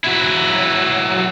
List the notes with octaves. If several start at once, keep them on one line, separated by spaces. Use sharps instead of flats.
F#3 E4